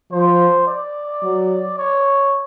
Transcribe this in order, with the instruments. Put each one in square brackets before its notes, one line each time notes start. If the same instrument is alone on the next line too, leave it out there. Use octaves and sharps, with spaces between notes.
[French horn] F3 [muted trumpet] C5
[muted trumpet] D5
[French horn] F#3
[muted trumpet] C#5